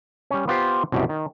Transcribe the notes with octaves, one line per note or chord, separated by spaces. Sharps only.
G3 C#4
B3 F4 G4 C5
C2 F#2 B2 G4
D#3